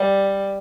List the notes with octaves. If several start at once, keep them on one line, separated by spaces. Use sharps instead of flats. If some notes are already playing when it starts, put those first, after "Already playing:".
Already playing: G3